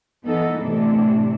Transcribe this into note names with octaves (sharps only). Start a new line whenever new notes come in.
E3 B3 D#4 A4
A2 C3 E3 A3 D4